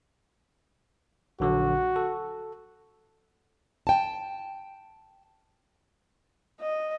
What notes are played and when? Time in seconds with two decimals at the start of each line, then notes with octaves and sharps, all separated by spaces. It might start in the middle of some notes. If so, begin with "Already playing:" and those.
1.40 A#1 D3 F#3 F#4
1.96 A4
3.87 G5 A5
6.60 D#5